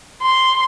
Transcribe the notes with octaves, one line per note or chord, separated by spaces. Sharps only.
C6